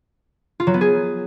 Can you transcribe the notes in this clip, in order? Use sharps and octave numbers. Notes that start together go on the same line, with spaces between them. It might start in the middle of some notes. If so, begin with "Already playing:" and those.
F4
F#3
B3
G#4